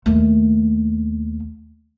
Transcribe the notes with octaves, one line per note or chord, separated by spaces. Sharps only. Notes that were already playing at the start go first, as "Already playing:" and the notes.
D#2 A3